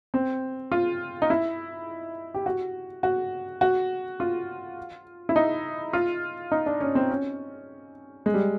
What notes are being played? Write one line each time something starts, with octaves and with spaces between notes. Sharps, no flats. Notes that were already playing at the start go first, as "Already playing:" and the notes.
C4
F4
D#4
E4
G4
F#4
F#4
F#4
F4
E4
D#4
F4
D#4
D4
C#4
C4
C#4
G#3
G3